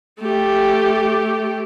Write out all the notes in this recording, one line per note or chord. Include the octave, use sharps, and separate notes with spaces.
A3 G4